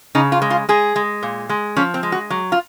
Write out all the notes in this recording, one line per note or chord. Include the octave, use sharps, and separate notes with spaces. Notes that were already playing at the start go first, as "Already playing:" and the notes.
C#3 D#4
F4
G#3
F4
G#3 G#4
G#3
A#2
G#3
F3 C#4
C4
G#3
F#4
F#3
F4